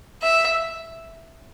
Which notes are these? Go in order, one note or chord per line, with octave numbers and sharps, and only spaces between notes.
E5